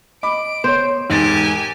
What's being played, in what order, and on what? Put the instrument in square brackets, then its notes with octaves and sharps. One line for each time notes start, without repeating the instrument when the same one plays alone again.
[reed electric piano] D#5 [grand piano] B5 D6 [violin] D7
[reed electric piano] B3 C#5 [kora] C5
[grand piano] E1 G#2 A6 [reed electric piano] D#4 [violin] G4 G#5